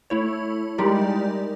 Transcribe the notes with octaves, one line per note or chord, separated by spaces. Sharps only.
A3 E4 C#5
G3 G#3 D#4 G4 A#4 D5